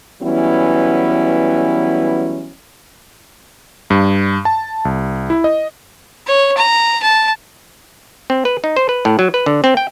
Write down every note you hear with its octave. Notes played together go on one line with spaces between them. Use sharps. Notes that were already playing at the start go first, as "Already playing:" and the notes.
E3 F#3 G3 B3 C#4 E4
G2
A5
C2
E4
D#5
C#5
A#5
A5
C4
B4
D#4
C5
B4
A2
F#3
B4
D3
C4
G5